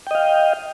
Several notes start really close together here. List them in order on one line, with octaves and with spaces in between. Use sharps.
G5 D#5 F5